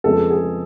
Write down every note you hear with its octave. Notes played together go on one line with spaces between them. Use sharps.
F2 C#3 F3 G#3 B3 A4
G#4